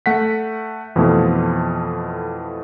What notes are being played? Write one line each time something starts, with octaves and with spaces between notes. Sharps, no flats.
A3 F#5 B6
F2 B2 E3 F3 A3